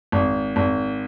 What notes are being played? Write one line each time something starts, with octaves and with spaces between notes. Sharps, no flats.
G#1
G#1